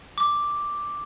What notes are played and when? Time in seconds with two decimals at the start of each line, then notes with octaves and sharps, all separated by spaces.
0.18 D6